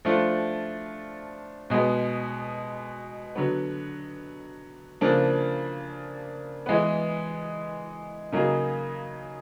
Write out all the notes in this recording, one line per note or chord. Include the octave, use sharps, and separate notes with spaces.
F3 A3 D4 F4
B2 G#3 B3
D3 F#3 B3
C#3 F3 A#3 D4
E3 G#3 B3
C#3 F#3 A#3 D#4 G#4